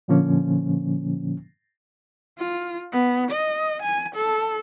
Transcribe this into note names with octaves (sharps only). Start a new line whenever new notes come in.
A#2 D3 F3 A#3 C#4
F4
B3
D#5
G#5
A4